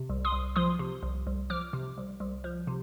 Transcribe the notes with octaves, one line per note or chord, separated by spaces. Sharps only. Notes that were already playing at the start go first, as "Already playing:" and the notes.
Already playing: C3
C2
C6 D#6
C2
F3 C6 D#6
C3
C2
C2
F3 D6 F6
C3
C2
C2
F3
C3